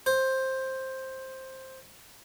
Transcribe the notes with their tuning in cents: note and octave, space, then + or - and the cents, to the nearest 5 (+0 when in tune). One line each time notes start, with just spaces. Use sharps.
C5 +10